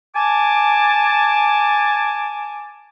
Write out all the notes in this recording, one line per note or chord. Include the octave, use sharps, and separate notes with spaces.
G#5 A5 D6